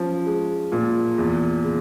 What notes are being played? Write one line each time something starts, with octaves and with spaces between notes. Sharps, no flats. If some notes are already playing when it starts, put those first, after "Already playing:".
Already playing: F3 C#4
G#3
A#2
E2
C#3